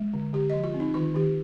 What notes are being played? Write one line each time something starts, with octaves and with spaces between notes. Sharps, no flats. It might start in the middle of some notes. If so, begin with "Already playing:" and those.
Already playing: G#3
D3
D3 G4
F3 D#5
F4
C4
D#4
D#3 F4
D#3 G4